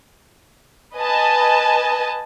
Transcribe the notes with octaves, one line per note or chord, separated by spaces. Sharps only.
B4 D#5 G#5 A5